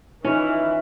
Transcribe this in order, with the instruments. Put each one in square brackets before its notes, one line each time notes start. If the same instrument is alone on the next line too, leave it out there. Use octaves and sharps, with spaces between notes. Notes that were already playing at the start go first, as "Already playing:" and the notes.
[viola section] E3 [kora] C#4 [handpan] D#4 [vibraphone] F4